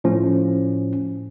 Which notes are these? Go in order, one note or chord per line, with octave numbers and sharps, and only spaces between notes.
A2 F3 C#4